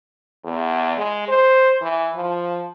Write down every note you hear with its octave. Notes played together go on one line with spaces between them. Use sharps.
E2
G#3
C5
E3
F3